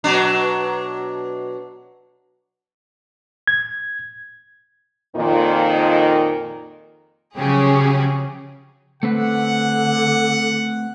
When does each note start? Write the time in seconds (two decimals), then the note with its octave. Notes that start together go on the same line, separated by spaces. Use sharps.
0.04 B2 F#3 D4
3.47 G#6
5.15 F2 A#2 D#3
7.37 C#3 F3 F#3 C#4 G4 G#4
9.03 D3 A3 C4 B4 F#5